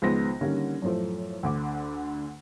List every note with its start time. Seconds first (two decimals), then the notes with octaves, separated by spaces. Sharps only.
0.02 C#2 D#3 F3 B3 C5 A#6
0.41 D3 D#3 G3 A#3 C#4
0.82 F#2 A2 F3 A3
1.43 D2 D3 D6